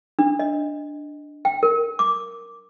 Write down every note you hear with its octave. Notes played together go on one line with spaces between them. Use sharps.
D4
D#5
G5
A#4
D6